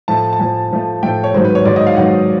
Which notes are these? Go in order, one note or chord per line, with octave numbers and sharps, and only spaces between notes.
A2 F3 A3 A5
A5
A2 F3 A3 G#5
A2 F3 A3
A2 F3 A3 G5
C#5
G#2 D#3 F#3 C5
B4
C#5
G#2 D#3 F#3 D5
D#5
F5
G#2 D#3 F#3 F#5